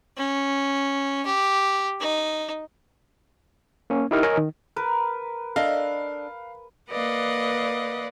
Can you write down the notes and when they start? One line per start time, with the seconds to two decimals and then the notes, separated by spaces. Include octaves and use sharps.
0.17 C#4
1.26 G4
2.00 D#4
3.90 A#3 C#4
4.11 D#4 E4 G4 A#4 F6
4.23 A#4 C#5 D#5 G#5 A#5
4.37 D#3
4.76 A#4 B4
5.56 D4 A4 D#5 F5
6.90 A#3 B4 D5 D#5 F5 F#5